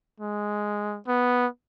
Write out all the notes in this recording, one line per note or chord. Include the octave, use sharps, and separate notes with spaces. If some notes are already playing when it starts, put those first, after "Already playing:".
G#3
B3